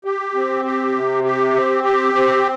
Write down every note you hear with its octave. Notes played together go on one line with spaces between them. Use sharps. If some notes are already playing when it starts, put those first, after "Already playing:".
G4
C4
G4
C3
G4
C4
G4
C4